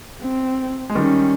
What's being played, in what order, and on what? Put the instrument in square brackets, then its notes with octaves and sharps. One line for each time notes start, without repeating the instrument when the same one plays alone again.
[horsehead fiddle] C4
[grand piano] G#3
[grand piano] D#3 G3 [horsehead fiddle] C#4